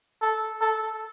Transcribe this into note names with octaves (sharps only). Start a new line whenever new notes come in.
A4
A4